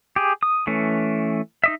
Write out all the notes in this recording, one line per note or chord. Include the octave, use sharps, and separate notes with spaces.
G4 G#4
D#6
E3 A3 C#4
D#4 D#5 E5